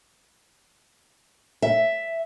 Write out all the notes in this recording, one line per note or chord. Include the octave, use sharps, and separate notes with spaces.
E5